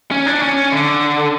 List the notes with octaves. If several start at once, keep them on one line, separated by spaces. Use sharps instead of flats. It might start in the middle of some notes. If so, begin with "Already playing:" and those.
C#4
D4
C#4
D3